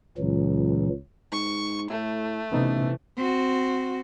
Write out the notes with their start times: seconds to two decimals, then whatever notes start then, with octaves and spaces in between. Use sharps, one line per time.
0.18 C#2 A#2 E3 F#3
1.32 G#2 C#6
1.90 A2 A3 E4
2.52 A1 C3 E3 B3 D#4
3.17 C4 F#4